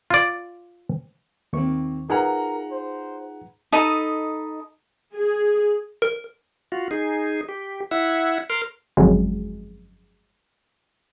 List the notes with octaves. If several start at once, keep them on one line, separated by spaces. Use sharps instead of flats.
F4 D5
D#2 D#3 A#3 C4 C#6
D#4 F4 G#4 A#4 B4 F#5 A#5
C5
D#4 A4 D#5 B5
G#4
A#4
F4 F#4
D#4 G#4
G4
E4 E5 F#5
A#4 C6 F6
G1 F2 C#3 F#3 G#3